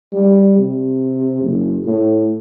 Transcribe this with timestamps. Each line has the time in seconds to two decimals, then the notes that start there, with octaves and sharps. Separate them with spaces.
0.13 G3
0.59 C3
1.42 F#1
1.85 A2